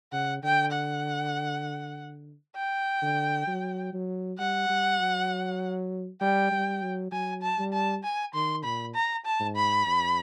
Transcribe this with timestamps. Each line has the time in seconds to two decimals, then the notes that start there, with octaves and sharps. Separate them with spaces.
0.12 C#3 F#5
0.43 D3 G5
0.73 F#5
2.56 G5
3.02 D3
3.47 F#3
3.93 F#3
4.39 G3 F#5
4.69 G3
4.99 F#3
6.21 G3 G5
6.51 G3
6.82 F#3
7.12 F#3 G#5
7.42 A5
7.58 G3
7.73 A5
8.03 G#5
8.34 D#3 C6
8.64 A#2 B5
8.95 A#5
9.25 A5
9.40 G#2
9.56 B5
9.86 F2